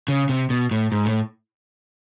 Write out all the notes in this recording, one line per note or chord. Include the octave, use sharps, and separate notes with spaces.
C#3
C3
B2
A2
G#2
A2